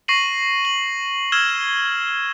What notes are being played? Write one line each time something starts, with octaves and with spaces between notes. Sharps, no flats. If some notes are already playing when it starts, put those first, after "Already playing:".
C#6 A#6 C7 D#7 F#7
F#7
E6 F6 G#6 E7 G7